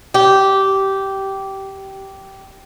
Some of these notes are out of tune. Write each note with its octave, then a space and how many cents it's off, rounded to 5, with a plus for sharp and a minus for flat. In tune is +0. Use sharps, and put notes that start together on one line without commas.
G4 -15